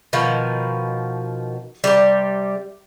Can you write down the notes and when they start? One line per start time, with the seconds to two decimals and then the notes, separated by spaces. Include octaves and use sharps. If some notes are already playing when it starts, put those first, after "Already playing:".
0.13 B2 D#3 F3
1.84 C3 G3